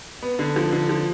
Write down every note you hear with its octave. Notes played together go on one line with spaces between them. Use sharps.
B3
D3
F3
D3
F3